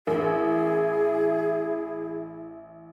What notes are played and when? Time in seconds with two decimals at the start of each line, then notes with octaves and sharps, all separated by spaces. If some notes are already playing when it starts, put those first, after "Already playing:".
0.07 A1 E4 G#4 A#4